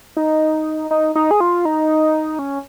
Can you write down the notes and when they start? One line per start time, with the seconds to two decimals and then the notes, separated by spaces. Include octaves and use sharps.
0.17 D#4
0.91 D#4
1.15 D#4
1.31 G#4
1.40 F4
1.65 D#4
2.39 C#4